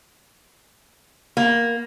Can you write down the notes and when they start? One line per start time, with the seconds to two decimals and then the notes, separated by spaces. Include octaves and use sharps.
1.37 A#3